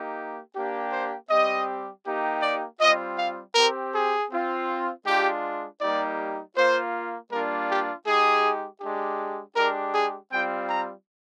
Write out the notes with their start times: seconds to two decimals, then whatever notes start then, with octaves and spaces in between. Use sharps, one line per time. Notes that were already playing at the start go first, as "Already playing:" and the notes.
Already playing: A#3 D#4 G4
0.55 A#3 D4 G4
0.92 C5
1.30 G3 C4 G4 D#5
2.05 A#3 D#4 G4
2.43 D5
2.80 G3 C4 F4 D#5
3.18 F5
3.55 C4 G4 A#4
3.93 G#4
4.31 C4 F4
5.05 G#3 D4 F4 G4
5.80 G3 A#3 D#4 G4 D5
6.56 A#3 F4 C5
7.31 G3 A#3 D4 F4 A#4
7.69 G4
8.06 G#3 D#4 G4 G#4
8.81 G#3 D4 G4
9.56 G#3 D4 G4 A#4
9.94 G#4
10.31 G3 C4 F4 G5
10.69 A#5